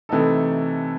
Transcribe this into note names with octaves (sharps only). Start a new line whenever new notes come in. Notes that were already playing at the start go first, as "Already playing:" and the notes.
C3 E3 A3 D#4 A4